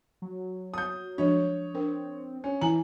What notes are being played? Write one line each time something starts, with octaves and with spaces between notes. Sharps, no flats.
F#3
D#6 G6
F3 G#3 D4 C#5
C4 D4 A#4
C#4
E3 E4 G#5 A#5 F#7